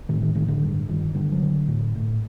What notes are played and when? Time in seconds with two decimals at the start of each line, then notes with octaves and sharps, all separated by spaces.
0.09 A2 D#3
0.22 D#3
0.35 A2 D#3
0.48 D3
0.62 G2
0.89 G2 D#3
1.14 D3 G3
1.32 F#3
1.42 D3
1.68 A2
1.95 A2